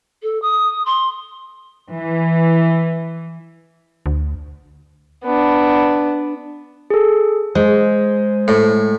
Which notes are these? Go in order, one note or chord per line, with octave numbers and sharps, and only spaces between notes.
A4
D#6
C6
E3
D2
B3 D4
G#4 A4
G#3 C5
A2